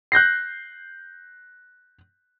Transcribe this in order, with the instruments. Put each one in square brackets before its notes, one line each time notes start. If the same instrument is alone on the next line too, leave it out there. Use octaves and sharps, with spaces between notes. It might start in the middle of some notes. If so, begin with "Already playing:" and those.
[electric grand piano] F#6 G6 A#6 C7